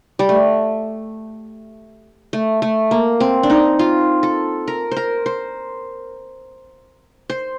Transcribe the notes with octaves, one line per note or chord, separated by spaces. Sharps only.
G3
A3
A3
A3
A#3
C4
D4
D#4
F4
A4
A#4
C5
A#4
C5
C5